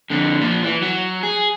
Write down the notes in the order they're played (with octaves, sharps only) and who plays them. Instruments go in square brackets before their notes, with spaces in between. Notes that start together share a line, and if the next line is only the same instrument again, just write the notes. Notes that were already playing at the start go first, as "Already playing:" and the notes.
[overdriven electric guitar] F2 D3
A#2 F3
E3
F#3
G#4